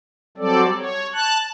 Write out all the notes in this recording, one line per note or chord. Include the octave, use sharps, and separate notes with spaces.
F#3 G3 C4 A4 D5
C#5
A5 F#6